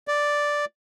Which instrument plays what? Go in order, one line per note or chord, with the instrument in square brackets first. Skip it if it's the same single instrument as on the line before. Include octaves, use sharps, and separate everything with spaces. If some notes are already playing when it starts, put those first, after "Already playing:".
[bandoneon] D5